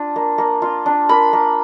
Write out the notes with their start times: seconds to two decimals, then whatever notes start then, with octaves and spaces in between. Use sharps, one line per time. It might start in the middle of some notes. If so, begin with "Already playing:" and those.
Already playing: D4 F4
0.16 A#3
0.38 A#3
0.62 F4
0.86 D4
1.09 A#3 B5
1.33 A#3